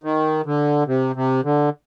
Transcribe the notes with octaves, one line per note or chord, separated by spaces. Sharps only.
D#3
D3
C3
C3
D3